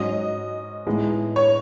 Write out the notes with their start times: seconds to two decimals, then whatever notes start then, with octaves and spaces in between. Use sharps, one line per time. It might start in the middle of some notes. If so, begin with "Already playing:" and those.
Already playing: G#2 F#3 C#4 D#5
0.86 A2 G#3 B3 D#4
1.36 C#5